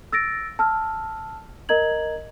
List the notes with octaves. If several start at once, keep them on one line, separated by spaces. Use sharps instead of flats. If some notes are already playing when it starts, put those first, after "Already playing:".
E6 A6 A#6 D7
A5 E6 F6
A#4 D#5 A#5 G#6 F#7